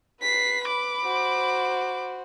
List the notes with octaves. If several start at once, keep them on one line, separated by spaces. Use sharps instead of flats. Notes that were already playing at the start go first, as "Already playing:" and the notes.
B4 B6 C7
B5 D6
F#4 C5